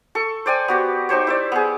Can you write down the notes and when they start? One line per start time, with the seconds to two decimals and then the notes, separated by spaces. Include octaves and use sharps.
0.15 A4 C#6
0.46 C5 D5 G5 G#5
0.68 B3 F#4 G4
1.09 D#4 G4 C5 C#5
1.27 E4 C5 D5
1.52 B3 G#4